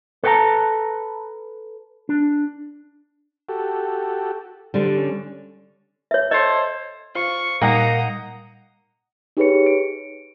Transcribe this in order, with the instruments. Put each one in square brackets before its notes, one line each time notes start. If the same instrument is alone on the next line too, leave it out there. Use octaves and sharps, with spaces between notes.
[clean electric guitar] A4 B4 C#5 G5 A5 A#5
D4
[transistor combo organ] F#4 G4 A4
[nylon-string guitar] D3 G3 [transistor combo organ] F#3 C5
[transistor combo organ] C#4
[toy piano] C#5 E5
[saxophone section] A4 C5 C#5 [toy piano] D#5
[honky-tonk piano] F4 [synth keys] C5 [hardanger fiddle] C#6
[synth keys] A#2 G3 [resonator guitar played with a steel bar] A#3 [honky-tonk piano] D#4 F#5 A#6 [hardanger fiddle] A#5 D#6
[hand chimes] D#4 G4 G#4 B4 C#5 C#7
D7